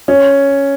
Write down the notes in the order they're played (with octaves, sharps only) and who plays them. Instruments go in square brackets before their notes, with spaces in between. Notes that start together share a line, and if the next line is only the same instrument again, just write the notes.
[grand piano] C#4